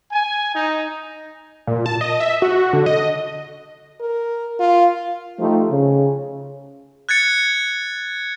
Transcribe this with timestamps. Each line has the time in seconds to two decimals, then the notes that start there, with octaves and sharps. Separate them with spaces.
0.12 G#5
0.55 D#4
1.67 A#2
1.86 A5
2.01 D#5
2.20 E5
2.42 F#4
2.73 D3
2.86 D#5
4.00 A#4
4.60 F4
5.40 F3 A3 D#4 F4 G4
5.71 C#3
7.09 F#6 G#6 A6 C#7